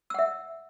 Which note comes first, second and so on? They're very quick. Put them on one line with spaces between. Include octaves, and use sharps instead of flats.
E6 F#5 E5